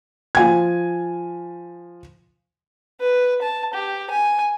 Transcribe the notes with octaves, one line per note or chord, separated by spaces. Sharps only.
F3 G#5 G#6
B4
A5
G4
G#5